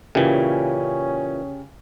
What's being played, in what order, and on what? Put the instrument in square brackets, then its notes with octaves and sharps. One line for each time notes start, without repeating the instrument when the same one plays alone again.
[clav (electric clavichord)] A#2 E3 [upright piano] C#3 G4 [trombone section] C#4